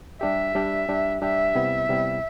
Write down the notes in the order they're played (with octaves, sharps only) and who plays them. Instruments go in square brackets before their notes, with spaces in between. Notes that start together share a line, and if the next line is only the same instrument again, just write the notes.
[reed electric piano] G3 D4 G4 [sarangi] E5
[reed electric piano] G3 D4 G4
G3 D4 G4
[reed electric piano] G3 D4 G4 [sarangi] E5
[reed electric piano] C3 G3 B3 E4
C3 G3 B3 E4